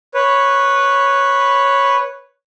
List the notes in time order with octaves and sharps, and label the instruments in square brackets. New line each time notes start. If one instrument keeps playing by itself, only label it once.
[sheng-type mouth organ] B4 C#5